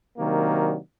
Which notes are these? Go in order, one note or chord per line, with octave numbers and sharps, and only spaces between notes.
C3 D#3 F#3 A#3 D4